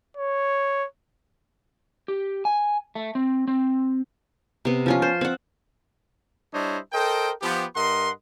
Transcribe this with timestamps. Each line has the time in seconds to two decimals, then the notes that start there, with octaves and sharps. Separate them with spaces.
0.17 C#5
2.08 G4
2.45 G#5
2.95 A3
3.15 C4
3.48 C4
4.65 C3 B3
4.86 F3 C#4 F4
5.02 C5
5.21 C4 F#5
6.54 G3 D4 E4 C5 C#5 D#5
6.93 A4 A#4 C5 D#5 G5
7.42 F3 B3 G4
7.75 G2 A#4 D#5 F#5 C6